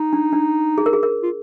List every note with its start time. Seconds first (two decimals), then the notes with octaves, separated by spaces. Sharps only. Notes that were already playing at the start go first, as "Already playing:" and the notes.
Already playing: D#4
0.13 D4
0.33 D4
0.78 G#4
0.86 A#4
0.93 G#4
1.03 A#4
1.23 F4